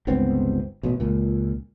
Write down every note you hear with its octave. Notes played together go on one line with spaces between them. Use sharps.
G1 C#2 B3 C4
A1 B2
C#2 A#2